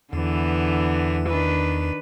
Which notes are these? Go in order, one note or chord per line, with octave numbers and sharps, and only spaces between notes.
E2 D3 E3 B3
D#3 D4 B4